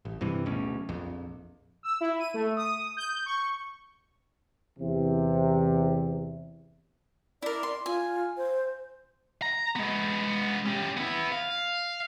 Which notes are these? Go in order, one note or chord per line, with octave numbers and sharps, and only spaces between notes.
A1
G2 C3 E3
D1 D2 B2 C#4
A#1 F2
E6
E4
D#7
A3
D#6
G6
C#6
E2 C3
E4 A#4 D5
C6
F4 G#5
C5
A#5
G#3 B3
C#4 G4
B3 E4
F5